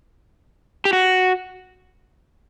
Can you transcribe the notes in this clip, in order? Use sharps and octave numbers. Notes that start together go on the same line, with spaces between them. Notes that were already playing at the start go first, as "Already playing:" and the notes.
G4
F#4